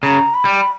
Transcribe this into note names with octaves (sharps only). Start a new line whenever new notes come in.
C#3 A#5
B5
G3